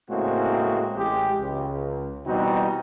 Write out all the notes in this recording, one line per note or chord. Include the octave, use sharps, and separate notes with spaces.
A2 C#3 G#3 A#3 C4 F#4
A1 G#3 G4
C#2
B2 E3 G3 C4 D#4 F#4